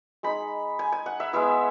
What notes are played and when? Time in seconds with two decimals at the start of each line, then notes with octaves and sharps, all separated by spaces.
0.23 G#3 D#4 B5
0.79 G#5
0.92 G#5
1.06 F#5
1.20 E5
1.33 G#3 B3 E4 E5